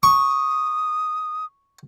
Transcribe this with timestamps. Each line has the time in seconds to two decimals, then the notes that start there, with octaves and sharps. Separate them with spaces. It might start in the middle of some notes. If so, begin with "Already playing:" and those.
0.03 C#6 D#6